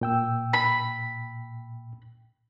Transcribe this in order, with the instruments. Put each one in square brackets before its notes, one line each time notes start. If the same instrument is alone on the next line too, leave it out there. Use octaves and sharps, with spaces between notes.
[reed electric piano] A#2 G5 E6
[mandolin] B5